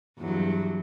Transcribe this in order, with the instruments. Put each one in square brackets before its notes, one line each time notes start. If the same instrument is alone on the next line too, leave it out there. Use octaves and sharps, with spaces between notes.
[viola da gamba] E2 G2 F#3